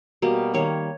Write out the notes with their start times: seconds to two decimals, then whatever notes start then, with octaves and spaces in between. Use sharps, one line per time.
0.22 B2 G3 A#3
0.54 D#3 G3 A#3 C#5